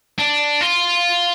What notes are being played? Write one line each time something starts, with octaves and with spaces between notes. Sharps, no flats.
D4
F4